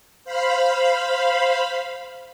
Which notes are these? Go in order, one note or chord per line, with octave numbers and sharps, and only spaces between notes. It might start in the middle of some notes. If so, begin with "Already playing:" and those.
C5 F5 B5